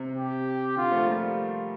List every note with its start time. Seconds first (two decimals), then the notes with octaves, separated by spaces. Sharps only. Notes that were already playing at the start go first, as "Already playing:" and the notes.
Already playing: C3
0.17 G4
0.77 D3 F4
0.92 F3 A3
1.06 G3 A#3